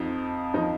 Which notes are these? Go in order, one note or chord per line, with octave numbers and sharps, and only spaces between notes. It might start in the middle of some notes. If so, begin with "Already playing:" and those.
Already playing: F2 F3 D#4
F3 D#4